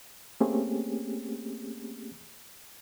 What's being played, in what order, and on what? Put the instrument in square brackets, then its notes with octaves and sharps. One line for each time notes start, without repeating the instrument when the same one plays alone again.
[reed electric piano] A3 A#3 C4 C#4 G4 G#4